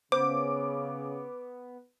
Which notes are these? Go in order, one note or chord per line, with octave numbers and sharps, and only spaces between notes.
C#3 B3 C5 D6